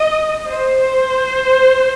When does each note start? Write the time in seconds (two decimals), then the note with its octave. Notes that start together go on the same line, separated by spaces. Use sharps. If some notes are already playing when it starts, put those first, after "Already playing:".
Already playing: D#5
0.48 C5